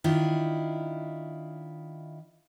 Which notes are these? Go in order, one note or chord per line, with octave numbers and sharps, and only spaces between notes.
D#3 D4 E4 F4